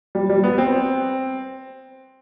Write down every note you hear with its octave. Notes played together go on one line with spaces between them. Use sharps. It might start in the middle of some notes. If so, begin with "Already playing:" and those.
G3
G3
B3
C4